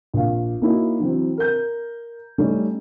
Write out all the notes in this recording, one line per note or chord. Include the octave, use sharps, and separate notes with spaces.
A#1 F5
A#3 C#4 D#4 E4 F#4
E3 F#3 C4
A#4 G6
G3 A3 C#4 D#4 G4 A4